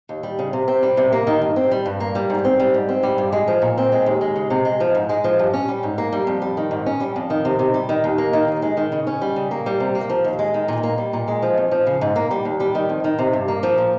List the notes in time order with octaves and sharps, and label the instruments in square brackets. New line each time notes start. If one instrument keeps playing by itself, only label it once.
[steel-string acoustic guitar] D#2
G3
C#3
C3
C4
G3
C3
A#3
D#3
G2
C4
G3
G2
A#3
G3
G#2
C4
G3
G#2
C4
G3
G2
G#3
F3
A#2
C4
G#3
D#2
G#3
C#3
C3
G#3
F3
G#2
G#3
F3
G2
C#4
G3
G#2
A#3
G3
F2
G3
D#3
G#2
C#4
G3
F2
D#3
C3
C3
G3
D#3
D#2
A#3
D#3
D#2
G#3
D#3
C#3
C#4
G3
C#3
A#3
G3
C3
A#3
F3
D#2
G#3
D#3
A#2
A#3
G3
A#2
G#3
F3
F2
F3
C#3
G#2
A#3
G3
D#2
G3
D#3
F2
D#3
C3
G2
A#3
F3
A#2